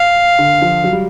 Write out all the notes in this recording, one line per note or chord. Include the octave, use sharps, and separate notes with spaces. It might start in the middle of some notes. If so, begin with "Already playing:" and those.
Already playing: F5
D3
F3
F#3
G3